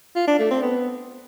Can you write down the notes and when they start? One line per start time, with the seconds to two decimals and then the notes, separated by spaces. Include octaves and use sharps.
0.16 F4
0.27 D4
0.39 A3
0.51 C4
0.62 B3